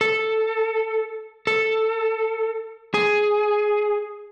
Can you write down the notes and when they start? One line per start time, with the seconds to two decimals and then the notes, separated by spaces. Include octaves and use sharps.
0.01 A4
1.47 A4
2.94 G#4